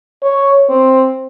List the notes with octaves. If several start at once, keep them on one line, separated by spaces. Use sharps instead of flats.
C#5
C4